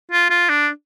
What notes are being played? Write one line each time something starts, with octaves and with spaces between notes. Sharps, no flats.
F4
F4
D4